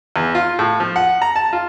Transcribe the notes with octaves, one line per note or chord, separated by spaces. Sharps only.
E2
F4
A2
F3
F#5
A#5
A5
F4